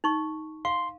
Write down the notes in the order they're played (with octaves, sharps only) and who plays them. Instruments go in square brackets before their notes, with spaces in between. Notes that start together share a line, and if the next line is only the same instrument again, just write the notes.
[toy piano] D#4 C#6
[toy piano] F5 [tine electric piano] C6